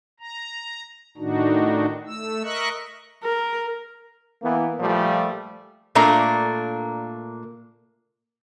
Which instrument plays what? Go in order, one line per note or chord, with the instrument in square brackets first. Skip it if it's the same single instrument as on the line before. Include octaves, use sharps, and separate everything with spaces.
[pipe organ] A#5
A2 D#3 D4 D#4 F#4
A3 E6
A#4 D#5 E5 C#6 F#6
[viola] A#4
[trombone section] E3 A#3 B3
A#2 F3 G3 A3
[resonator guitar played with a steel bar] A#2 A3 A#3 D4 A#5